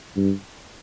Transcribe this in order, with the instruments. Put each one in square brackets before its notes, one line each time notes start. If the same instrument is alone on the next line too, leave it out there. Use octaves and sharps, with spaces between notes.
[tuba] G2